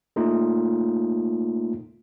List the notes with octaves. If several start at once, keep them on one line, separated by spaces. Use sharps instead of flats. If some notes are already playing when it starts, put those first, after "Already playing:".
A3 A#3 D#4 F4